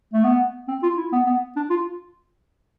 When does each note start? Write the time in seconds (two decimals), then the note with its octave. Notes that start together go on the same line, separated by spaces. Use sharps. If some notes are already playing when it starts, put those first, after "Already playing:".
0.13 A3
0.24 B3
0.68 C4
0.83 F4
0.97 E4
1.12 B3
1.27 B3
1.56 D4
1.70 F4